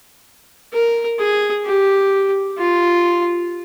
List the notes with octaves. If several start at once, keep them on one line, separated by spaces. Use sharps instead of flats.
A#4
G#4
G4
F4